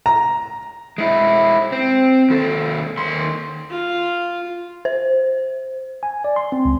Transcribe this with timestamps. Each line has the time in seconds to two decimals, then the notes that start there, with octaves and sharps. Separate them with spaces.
0.06 A#5
0.98 G#3 E4
1.72 C4
2.30 D#2 A4
2.98 D#2 C6
3.70 F4
4.85 C5
6.03 G#5
6.24 D5
6.36 C6
6.52 C4
6.65 C#2